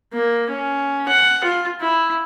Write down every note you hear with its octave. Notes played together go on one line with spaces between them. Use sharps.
A#3
C#4
F#5
F4
E4